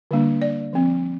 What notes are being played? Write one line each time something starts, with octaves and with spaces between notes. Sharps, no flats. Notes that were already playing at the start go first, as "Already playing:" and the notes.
D3 G3 A#3 D4
D5
F3 C4